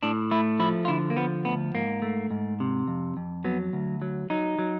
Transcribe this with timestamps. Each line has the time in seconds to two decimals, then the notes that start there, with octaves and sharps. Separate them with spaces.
0.03 A2 D4
0.31 A3 E4
0.59 F3 E4
0.85 F4
0.88 D3 E4
1.10 A#3
1.17 F3 B3
1.45 D2 B3
1.75 G#2 A#3
2.02 A3
2.31 G#2
2.60 C3
2.88 F2
3.17 F2
3.44 F#3 B3
3.73 D2
4.02 F#3
4.30 F#3 D#4
4.59 F#3